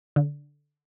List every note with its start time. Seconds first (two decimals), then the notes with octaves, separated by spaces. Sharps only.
0.16 D3